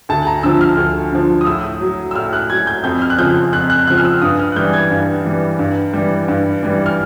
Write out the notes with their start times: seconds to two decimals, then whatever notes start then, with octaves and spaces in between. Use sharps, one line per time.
0.09 D2 A5
0.27 A#5
0.43 D3 F3 E6
0.61 F6
0.77 D2
1.12 D3 F3
1.41 D#6
1.46 A2 E6
1.81 F#3
2.11 E6
2.15 A2 F6
2.33 F#6
2.50 F#3 G#6
2.67 G6
2.84 F2 G6
3.02 F6
3.10 F#6
3.18 C#3 F3 G6
3.53 F2 F#6
3.70 F#6
3.88 C#3 F3 F#6
3.98 F6
4.05 E6
4.22 G2 D#6
4.39 F6
4.52 F#6
4.56 E3 G3 G6
4.73 G#6
4.91 G2
5.25 E3 G3
5.59 G2
5.93 E3 G3
6.28 G2
6.63 E3 G3
6.86 F6